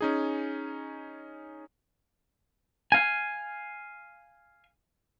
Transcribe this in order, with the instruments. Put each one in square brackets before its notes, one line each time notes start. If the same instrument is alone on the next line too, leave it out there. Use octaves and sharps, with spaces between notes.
[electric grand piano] C#4 D#4 G#4
[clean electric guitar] F5 G#5